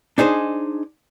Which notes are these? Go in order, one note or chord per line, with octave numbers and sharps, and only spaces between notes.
D4 D#4 G#4 C5